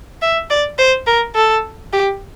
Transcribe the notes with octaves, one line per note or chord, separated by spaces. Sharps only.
E5
D5
C5
A#4
A4
G4